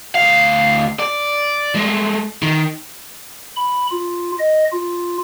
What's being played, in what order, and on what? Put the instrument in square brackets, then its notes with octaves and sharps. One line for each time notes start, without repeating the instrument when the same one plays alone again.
[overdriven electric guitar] D2 F5
D5
G#3 A3
D#3
[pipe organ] B5
F4
D#5
F4